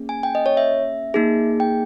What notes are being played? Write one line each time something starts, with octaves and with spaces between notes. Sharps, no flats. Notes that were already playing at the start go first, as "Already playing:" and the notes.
Already playing: A#3 C#4 G#4
G#5
G5
D#5
C#5
E5
A#3 D#4 G#4
G5